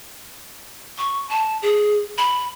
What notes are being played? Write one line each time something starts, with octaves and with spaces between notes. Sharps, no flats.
C#6
A5
G#4
B5